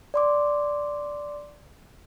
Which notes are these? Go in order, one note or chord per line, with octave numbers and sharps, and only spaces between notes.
D5 C6 D6